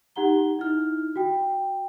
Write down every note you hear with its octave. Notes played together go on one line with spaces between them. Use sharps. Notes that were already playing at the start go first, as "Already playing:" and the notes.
D#4 G4 F#5 A#5 G7
D#4 E4 F6
F#4 G5